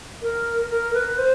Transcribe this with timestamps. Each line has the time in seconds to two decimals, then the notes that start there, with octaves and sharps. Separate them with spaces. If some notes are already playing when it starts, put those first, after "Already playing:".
0.23 A#4
0.70 A#4
0.94 B4
1.18 C5